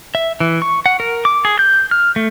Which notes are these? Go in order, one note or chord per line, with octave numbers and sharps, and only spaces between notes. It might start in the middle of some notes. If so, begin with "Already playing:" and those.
E5
E3
C#6
F#5
A#4
D6
G#4
G6
F6
A3